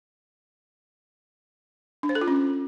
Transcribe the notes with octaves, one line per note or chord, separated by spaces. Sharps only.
D4
C5
A4
F4
C#4